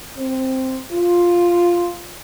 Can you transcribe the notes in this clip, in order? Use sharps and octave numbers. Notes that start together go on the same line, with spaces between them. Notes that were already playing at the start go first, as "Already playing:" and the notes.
C4
F4